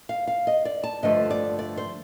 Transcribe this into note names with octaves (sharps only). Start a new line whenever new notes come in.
F5
F5
D#5
D5
A5
G2 D3 F3 A3 D#5
D5
D5
C5